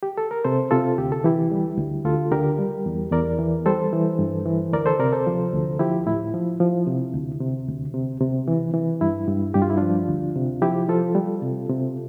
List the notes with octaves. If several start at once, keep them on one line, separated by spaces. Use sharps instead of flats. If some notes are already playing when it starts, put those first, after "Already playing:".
G4
A4
A#4
C3 A4 C5
C3 F4 A4
D2 G4
A4
E3 E4 G4
G3
D2
D2 F4 A4
D3 G4 A#4
G3
E2
E2 A#4 D5
E3
G3 A4 C5
E3
G2
E3
D2 A#4 D5
A4 C5
C3 A#4 D5
A4 C5
F3
D2
F3 E4 G4
A2 E4
F3
F3
C3
D2
C3
D2
C3
C3
E3
E3
G2 E4
G2
G2 G4
F4
E4
F3 D4 F4
D2
C3
F3 E4 G4
F3 F4 A4
G3
C3
C3